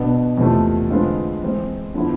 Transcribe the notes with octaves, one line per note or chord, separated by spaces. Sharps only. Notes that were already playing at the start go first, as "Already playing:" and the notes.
Already playing: B2 B3 D4
E2 C3 F3 A3
D3 G#3 C4 F4 B4
E3 G#3 C4
D3 F3 B3 E4